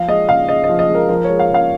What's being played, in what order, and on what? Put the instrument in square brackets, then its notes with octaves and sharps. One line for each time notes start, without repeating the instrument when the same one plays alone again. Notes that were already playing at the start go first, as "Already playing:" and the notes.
Already playing: [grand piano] F3 F5
G#3 D#5
C#3 F5
C#3 D#5
D#5
F3
D#5
G#3
A#4
F3 A#4
G#3 C#5
F5
C#3 F5